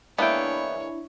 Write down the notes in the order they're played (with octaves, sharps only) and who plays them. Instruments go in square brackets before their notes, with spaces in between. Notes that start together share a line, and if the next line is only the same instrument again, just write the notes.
[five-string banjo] E3 G#3 A#3 [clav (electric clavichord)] B3 G5 [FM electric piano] D4 E4 [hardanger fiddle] C#5